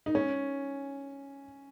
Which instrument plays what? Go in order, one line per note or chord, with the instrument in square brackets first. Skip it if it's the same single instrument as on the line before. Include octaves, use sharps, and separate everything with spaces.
[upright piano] D#4
C#4